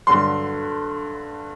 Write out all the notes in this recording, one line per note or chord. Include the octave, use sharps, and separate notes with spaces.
G2 D3 F#3 C6